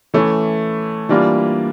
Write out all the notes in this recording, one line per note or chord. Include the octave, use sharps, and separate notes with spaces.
E3 A3 C#4
E3 G3 A#3 D4 F4